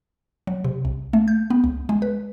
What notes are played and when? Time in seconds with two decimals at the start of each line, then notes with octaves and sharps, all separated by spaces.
0.47 F#3
0.64 C3
0.85 C2
1.13 A3
1.28 G6
1.50 B3
1.64 C#2
1.89 G#3
2.02 B4